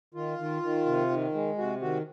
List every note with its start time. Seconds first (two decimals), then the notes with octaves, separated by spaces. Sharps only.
0.14 D#3 F4
0.38 D#3
0.62 D#3
0.86 C3
1.10 D#3
1.34 G#3
1.58 C3 F#4
1.81 D#3 F#4